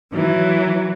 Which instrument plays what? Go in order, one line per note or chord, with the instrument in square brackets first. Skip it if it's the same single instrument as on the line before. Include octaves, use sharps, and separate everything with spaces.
[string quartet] E3 F#3